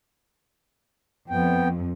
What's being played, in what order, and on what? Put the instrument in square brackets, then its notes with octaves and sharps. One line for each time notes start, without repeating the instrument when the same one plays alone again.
[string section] F2 [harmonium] B3 G5